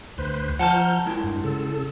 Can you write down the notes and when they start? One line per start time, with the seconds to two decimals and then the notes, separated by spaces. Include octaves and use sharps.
0.18 D2 B4 C5
0.59 F3 F#5 A5 A#5 F6 G6
1.06 G#3 E4 F4
1.24 G2
1.44 C#3 A4